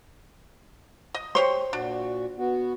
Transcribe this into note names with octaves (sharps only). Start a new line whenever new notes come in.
D#5
G4 C5 C#5 C6
A#2 D4 F#4
B3 F#4